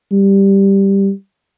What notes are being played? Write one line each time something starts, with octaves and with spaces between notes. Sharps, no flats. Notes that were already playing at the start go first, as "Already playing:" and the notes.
G3